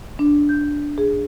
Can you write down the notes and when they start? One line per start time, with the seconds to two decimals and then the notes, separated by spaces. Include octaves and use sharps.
0.19 D4
0.49 G6
0.98 G#4